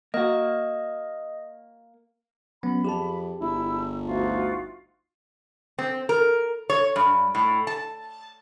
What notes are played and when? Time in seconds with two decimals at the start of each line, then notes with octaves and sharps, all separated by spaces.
0.14 A#3 F#4 D#5
2.63 F#3 B3 C#4 B5
2.85 F2 G4 G#4 A5
3.41 G1 E4 E6
4.04 D2 D#4 F4 F#4
5.79 C4
6.09 A#4
6.70 C#5
6.96 G2
7.35 A2
7.67 A5